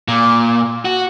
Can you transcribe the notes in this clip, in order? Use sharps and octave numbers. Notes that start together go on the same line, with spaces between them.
A#2
F#4